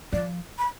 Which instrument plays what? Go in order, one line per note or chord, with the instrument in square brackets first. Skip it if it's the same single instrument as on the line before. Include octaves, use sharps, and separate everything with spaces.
[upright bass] F3 [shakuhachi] D5
[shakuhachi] B5